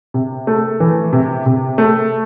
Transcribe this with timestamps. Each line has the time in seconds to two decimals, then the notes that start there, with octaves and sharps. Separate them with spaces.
0.14 C3
0.47 A3
0.80 E3
1.13 C3
1.46 C3
1.78 A3